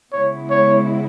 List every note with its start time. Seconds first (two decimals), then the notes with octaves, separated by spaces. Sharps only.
0.12 C#3 G#3 B3 E4 C#5
0.50 C#5